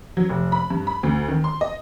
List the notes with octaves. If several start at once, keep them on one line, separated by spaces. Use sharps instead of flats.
F#3
F1
B5
G2
B5
D2
D#3
C6
D#5